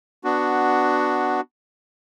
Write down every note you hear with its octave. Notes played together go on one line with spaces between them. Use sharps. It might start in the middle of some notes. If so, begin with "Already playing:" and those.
B3 D4 F#4